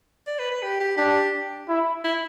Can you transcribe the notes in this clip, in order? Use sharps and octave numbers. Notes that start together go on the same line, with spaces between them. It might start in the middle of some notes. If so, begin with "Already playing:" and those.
D5
B4
B4
G4
G4
D4 G4
E4
E4